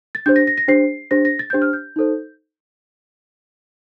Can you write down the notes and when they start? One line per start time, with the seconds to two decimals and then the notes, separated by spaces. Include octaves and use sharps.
0.15 A6
0.26 D4 G4 C5 G6
0.36 A#6
0.47 A#6
0.58 A#6
0.68 D4 G4 C5 C7
1.11 D4 G4 C5 A#6
1.25 A#6
1.39 A6
1.50 D4 G4 C5 G6
1.62 F6
1.73 G6
1.96 D#4 A4 C5